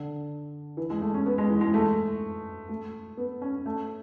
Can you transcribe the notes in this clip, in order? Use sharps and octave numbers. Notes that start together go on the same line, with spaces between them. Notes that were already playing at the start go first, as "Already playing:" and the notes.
Already playing: D3
E3
G#3
A3
C#4
B3
G#3
E3
G#3
A3
A3
B3
C#4
A3